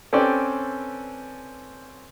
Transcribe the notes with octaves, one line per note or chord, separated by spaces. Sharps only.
C4 C#4 A4 B4 D5 G5